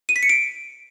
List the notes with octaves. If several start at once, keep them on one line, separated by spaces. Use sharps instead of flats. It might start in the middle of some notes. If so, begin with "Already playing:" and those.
D#7
B6
C#7
D7